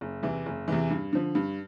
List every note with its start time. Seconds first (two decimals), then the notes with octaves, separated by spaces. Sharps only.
0.01 F#1
0.23 E2 C3 E3
0.46 F#1
0.68 E2 C3 E3
0.90 G2
1.13 D3 F3
1.35 G2